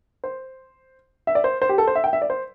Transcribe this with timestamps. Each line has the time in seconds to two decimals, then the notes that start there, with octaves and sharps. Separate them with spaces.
0.24 C5
1.27 E5
1.35 D5
1.44 C5
1.62 C5
1.69 G4
1.78 A4
1.87 C5
1.95 E5
2.04 G5
2.13 E5
2.22 D5
2.30 C5